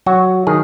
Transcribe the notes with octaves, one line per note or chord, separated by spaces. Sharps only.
F#3 F#4
D#3 G#4